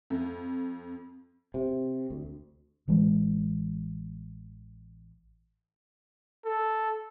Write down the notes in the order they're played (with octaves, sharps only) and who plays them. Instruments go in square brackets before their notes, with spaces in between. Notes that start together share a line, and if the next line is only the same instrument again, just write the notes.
[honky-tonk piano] F2
[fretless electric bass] C3
D2
[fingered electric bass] A1 E3 G#3
[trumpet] A4